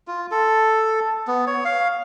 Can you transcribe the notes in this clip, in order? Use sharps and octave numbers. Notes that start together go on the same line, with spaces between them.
F4
A4
B3
C#5
F5